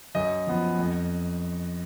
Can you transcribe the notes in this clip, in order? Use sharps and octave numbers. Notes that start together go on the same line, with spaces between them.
F#2 D#5
F3 B3
F2